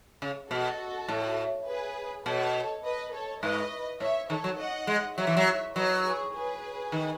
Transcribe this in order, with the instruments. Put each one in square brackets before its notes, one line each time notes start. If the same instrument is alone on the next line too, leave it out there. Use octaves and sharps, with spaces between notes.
[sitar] C#3
[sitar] B2 [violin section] F#4 A4
[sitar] A2
[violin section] G#4 B4
[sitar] B2 [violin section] A4 C#5
[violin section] B4 D#5
A4 C#5
[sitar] G#2 [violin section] B4 D#5
[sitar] A2 [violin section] C#5 E5
[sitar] D#3 [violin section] A4 C#5
[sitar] F#3
[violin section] D#5 F#5
[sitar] G#3
[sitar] F#3 [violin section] C#5 E5
[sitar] E3
F#3
[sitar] F#3 [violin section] B4 D#5
[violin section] G#4 B4
G#4 B4
[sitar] D#3